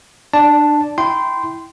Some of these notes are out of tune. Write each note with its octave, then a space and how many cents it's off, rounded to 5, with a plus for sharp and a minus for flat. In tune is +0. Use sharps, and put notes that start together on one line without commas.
D4 +25 D5 -5 A5 +0
E4 -10 G5 -10 C6 -15